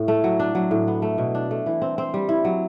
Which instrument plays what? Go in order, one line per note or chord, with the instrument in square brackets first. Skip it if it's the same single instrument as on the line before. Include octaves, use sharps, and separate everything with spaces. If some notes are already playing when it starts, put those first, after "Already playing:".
Already playing: [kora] A2
A3
F#3
D4
F#3
A2
B3
A3
B2
D4
A3
E3
C4
C4
G3
E4
F#3